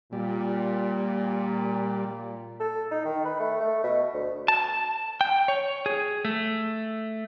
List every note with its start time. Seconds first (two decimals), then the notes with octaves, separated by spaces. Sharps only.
0.13 A#2 G3
2.60 A4
2.91 D#4
3.05 D#3
3.25 B4
3.40 A3
3.60 A3
3.84 B2
4.14 D2
4.48 A5
5.21 G5
5.48 C#5
5.86 G#4
6.25 A3